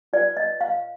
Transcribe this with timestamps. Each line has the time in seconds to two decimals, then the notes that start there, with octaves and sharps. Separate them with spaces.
0.13 F4 B4 D5
0.37 D#5
0.61 F5